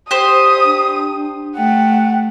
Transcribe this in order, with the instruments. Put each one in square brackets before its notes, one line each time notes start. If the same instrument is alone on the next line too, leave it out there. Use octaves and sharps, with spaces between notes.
[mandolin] G4 C5 [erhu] D#6
[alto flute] D4
[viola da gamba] A3 [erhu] F#5 [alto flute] G5